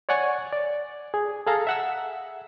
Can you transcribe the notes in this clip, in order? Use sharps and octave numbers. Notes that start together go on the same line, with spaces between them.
C#5 D5 F#5 G#5 C#6
D5
G#4
G#4 A4 F5 A#5
E5 F#5 E6